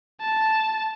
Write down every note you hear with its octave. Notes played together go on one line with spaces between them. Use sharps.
A5